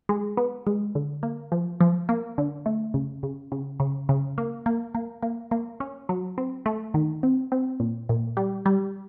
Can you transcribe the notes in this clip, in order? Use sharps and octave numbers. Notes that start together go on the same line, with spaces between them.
G#3
B3
G#3
D3
A#3
F3
F3
A#3
D3
A3
C#3
C#3
C#3
C#3
C#3
A#3
A#3
A#3
A#3
A#3
C#4
F#3
C4
A3
D#3
C4
C4
A#2
A#2
G3
G3